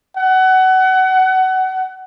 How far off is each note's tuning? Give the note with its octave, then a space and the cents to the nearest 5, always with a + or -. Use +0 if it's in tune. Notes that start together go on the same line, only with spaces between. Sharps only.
F#5 +25